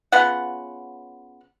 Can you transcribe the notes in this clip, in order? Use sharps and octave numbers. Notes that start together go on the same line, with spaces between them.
C#3 B3 F4 F#5